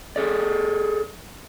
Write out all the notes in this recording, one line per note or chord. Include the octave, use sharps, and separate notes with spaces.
G#4 A4 D5